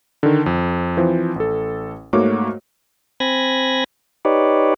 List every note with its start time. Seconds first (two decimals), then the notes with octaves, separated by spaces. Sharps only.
0.23 D3 D#3
0.46 F2
0.97 E3 F3 C4
1.36 A1 A4
2.13 G#2 A3 A#3 F#4 C#5 D6
3.20 C4 G#5 B5 G#6 A#6
4.25 D#4 G4 B4 C#5 D5